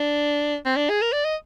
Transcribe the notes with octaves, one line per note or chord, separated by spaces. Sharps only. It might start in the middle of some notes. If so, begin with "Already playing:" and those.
Already playing: D4
C4
D4
G#4
A#4
D5
D#5